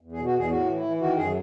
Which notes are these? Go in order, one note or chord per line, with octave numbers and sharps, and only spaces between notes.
E2
G#4
B2
F#4
E2 G#4
A2 F#4
E3
E4
E3
D#3 F#4
F#2 G#4